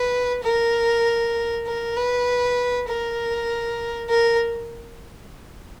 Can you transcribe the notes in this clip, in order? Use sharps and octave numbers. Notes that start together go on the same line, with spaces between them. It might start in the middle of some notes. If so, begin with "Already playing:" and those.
Already playing: B4
A#4
A#4
B4
A#4
A#4